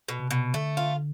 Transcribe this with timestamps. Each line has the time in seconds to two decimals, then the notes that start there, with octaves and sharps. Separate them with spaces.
0.08 B2
0.19 C3
0.31 B2
0.54 D3 A3
0.77 F4